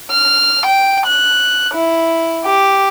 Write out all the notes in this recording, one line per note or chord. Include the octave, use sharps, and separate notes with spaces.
F6
G5
F#6
E4
G4